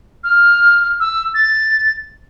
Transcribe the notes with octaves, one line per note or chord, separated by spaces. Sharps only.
F6
E6
A6